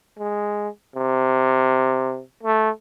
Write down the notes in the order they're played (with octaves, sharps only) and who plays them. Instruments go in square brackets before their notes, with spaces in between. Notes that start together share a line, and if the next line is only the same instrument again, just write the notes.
[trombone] G#3
C3
A3